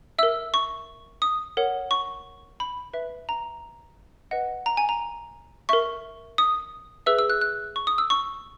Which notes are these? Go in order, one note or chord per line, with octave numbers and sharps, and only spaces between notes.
A#4 E5 E6
C#6
D#6
A#4 C#5 F#5
C#6
B5
B4 E5
A#5
B4 D#5 F#5
A#5
G#5
A#5
A#4 E5 C#6
D#6
G#4 B4 E5 E6
E6
F#6
F#6
C#6
D#6
E6
C#6